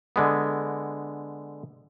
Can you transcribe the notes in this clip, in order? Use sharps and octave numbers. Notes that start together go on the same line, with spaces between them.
D3 G#3 B3